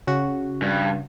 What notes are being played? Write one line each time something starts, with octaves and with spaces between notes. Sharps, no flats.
C#3 F#4
G2